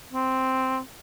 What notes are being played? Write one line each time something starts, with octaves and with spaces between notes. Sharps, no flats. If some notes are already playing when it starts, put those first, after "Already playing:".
C4